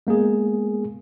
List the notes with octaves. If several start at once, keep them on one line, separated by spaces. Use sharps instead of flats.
G#3 A#3 B3 G#4